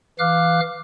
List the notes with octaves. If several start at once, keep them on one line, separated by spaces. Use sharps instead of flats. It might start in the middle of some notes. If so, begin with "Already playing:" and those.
E3 F5 D6 F6 F#6